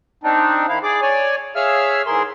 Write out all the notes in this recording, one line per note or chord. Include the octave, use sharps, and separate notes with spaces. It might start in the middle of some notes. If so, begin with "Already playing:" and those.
C4 D4 D#4
D#3 E4 F5
G#4 D5 D6
C#5 D5 G#5
G#4 C#5 E5 F5 E6 F6
G#2 E3 G#4 A#4 C6